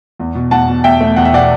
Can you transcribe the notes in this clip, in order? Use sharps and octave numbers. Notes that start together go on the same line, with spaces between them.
E2
B2
E2 F#5 A5
B2
E2 E5 G5
A3
E2 F#5
E5
B2 D5 F#5